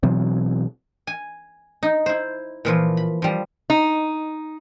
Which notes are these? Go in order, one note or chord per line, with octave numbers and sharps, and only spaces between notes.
B2 E3 F#3 C4
G#5
D#4
E4 C5
A#2 E3 F3
B5
F3 G3
D#4